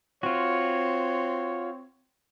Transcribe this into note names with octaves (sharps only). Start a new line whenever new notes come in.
C4 F4 F#4 C#5